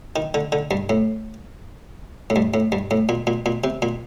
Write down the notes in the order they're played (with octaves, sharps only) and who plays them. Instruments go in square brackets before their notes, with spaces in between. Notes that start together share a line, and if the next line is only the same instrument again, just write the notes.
[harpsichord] D#3
D3
D3
G2
A2
A2
G2
A2
G2
A2
A#2
A#2
A#2
C3
A#2